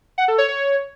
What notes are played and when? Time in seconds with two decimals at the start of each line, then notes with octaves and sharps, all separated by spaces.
0.18 F#5
0.28 A4
0.38 C#5
0.48 C#5